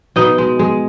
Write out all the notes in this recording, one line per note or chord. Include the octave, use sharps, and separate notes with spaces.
B2 D#4 D#5
G#3
G#3